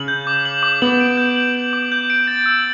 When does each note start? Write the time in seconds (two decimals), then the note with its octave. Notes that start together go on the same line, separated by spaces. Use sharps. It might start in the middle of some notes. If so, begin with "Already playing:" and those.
Already playing: C#3 F#7
0.08 G6
0.27 D6
0.45 F#7
0.63 D6
0.82 B3 F#7
1.00 D7
1.17 G6
1.36 F#7
1.55 F#7
1.73 D6
1.92 G6
2.10 D7
2.27 A6
2.46 E6